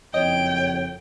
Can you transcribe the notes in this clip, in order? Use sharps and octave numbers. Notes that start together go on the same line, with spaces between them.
F#1 F2 C#5 D#5 G5